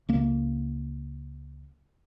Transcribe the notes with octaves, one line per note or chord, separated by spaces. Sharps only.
C#2 A#3